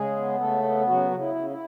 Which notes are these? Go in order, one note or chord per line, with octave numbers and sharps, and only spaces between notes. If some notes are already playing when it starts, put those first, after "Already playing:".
Already playing: C#3 G#3 G#4
B3
C#3 A3 A4
B3
C#3 F#3 F#4
C#3
E4
C#3
E4